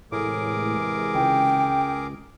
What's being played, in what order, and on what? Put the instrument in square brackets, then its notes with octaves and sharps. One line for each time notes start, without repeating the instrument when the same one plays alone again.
[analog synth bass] A2 [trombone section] C3 E3 G#3 [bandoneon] G#4 A#4 D6
[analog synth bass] C#2 [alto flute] G5